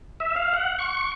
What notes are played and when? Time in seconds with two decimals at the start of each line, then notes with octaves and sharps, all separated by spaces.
0.20 E5
0.36 F5
0.54 F#5
0.79 C#6